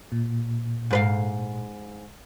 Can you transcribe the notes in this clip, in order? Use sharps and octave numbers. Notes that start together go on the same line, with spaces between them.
A#2
G#2 B4 F5